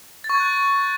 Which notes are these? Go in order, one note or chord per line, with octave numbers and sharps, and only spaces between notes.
A6
C#6
G#6
F#6